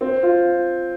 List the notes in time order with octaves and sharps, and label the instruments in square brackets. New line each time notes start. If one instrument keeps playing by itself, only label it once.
[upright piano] C4
F4